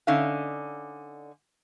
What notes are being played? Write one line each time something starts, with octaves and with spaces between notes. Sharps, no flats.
D3 C#4 D#4 E5 F5